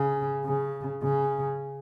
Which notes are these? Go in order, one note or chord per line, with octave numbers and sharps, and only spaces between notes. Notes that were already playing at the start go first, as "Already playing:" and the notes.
Already playing: C#3
C#3
C#3